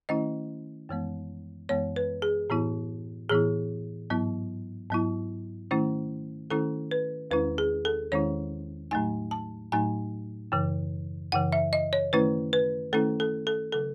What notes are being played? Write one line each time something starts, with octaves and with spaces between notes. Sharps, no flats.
D#3 A3 C#4 E4 D#5
F#2 E3 G#3 B3
F#2 E3 G#3 B3 C#5
B4
G#4
A2 E3 B3 E4
A2 E3 B3 E4 G#4
G#2 F#3 B3 E4
G#2 F#3 B3 E4
D#3 A3 C#4 E4
D#3 A3 C#4 E4 A4
B4
E2 D#3 G#3 C#4 E4 B4
G#4
A4
E2 D#3 G#3 C#4 E4 C#5
A2 F#3 A3 D#4 G#5
A5
A2 F#3 A3 D#4 G#5
F#2 C#3 E3
F#2 C#3 E3 F#5
E5
D#5
C#5
D#3 A3 C#4 E4 B4
B4
D#3 A3 C#4 E4 A4
A4
A4
C#3 F#3 A4